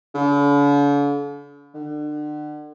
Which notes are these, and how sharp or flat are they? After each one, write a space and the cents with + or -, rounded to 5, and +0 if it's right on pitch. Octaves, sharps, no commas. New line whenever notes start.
D3 -45
D3 +35